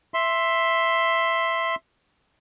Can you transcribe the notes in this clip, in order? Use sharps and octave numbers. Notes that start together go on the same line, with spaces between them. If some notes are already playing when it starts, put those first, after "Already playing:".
E5 C6